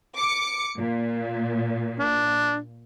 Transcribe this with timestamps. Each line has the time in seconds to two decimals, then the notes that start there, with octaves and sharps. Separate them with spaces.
0.17 D6 C#7
0.79 A#2
1.99 D4